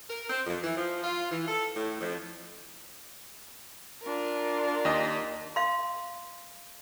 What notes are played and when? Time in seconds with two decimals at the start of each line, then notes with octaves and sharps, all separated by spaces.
0.10 A#4
0.30 C4
0.47 F2
0.64 E3
0.77 F3
1.04 F4
1.31 E3
1.48 A4
1.75 A2
2.01 F2
4.03 D4 F4 A#4
4.85 D#2 D#5
5.56 F5 C6